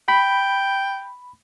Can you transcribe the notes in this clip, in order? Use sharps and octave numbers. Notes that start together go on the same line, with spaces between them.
G5 B5